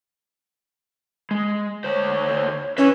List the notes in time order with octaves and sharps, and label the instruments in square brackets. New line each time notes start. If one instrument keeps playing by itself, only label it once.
[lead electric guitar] G#3
[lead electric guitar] D2 C5 [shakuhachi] C#5
[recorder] C#4 [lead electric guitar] B4 E5